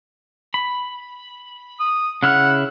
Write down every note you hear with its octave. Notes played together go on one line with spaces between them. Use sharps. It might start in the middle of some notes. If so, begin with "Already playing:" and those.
B5
D#6
C#3 E4 F#5 F6